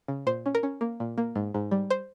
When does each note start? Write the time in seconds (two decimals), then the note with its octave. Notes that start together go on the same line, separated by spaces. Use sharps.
0.08 C#3
0.26 A#2 C5
0.46 C#4
0.55 A#4
0.63 C#4
0.81 A#3
1.00 A#2
1.18 A#3
1.36 G#2
1.54 G#2
1.71 G3
1.90 C5